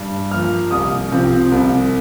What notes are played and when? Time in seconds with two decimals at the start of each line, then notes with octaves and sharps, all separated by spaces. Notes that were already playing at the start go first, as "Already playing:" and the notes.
Already playing: G2
0.31 F3 A#3 F6
0.71 C2 D#6
1.11 C3 F3 C4
1.52 C2